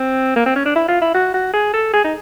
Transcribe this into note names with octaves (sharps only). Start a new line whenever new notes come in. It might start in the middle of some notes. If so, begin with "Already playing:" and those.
Already playing: C4
A#3
C4
C#4
D4
E4
F4
E4
F#4
F#4
G#4
A4
G#4
D#4